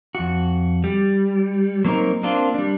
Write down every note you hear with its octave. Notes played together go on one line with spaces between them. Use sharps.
F2 F#4
G3
F#3 A#3 C4 D#4 A#4
A#3 C4 D4 F4
G3 D4